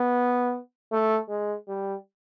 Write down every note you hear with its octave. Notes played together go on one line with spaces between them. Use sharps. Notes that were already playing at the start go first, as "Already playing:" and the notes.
Already playing: B3
A3
G#3
G3